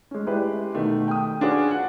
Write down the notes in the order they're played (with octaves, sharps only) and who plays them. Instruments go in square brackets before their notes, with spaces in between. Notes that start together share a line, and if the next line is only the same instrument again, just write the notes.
[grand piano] G#3 C#4
G#3 E4 G4 B4 D5
B2 D#3 A3
G5 D#6
C#4 D4 F4 F#4 G#4 B4
F#5